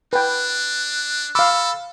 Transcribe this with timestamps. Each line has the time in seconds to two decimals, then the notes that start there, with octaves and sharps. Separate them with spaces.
0.13 D4 B4 G5 F#6
1.35 A4 F5 B5 D6 E6